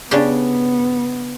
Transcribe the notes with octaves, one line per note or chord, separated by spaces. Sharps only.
C#3 B3 D4 G4